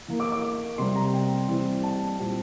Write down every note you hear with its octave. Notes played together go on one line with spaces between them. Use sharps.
E3 A#3
D6
D6
C3 G3 C4 C6
A#5
G5
E3 G3 C4
A5
A#2 G3 C4